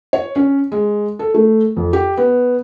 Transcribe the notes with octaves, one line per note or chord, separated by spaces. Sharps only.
C#5
C#4
G#3
A4
A3
F2
G4
B3